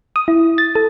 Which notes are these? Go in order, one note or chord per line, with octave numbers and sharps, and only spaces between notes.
D#6
E4
A6
A4